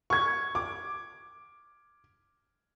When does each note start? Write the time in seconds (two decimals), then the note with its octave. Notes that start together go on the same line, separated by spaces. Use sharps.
0.10 C#6 G#6
0.55 D6